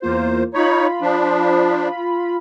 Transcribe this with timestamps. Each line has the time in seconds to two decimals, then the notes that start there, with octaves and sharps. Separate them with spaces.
0.02 E2 A#3 F4 C5
0.54 D#4 F4 C#5 B5
1.01 F3 D4